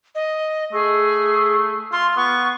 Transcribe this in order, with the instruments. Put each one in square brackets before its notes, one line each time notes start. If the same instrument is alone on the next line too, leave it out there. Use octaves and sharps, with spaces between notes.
[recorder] D#5
[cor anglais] A3 [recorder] G#4
[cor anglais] F4 [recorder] C6
[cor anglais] B3 [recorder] C#6